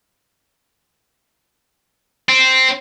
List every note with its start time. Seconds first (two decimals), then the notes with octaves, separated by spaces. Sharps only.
2.29 C4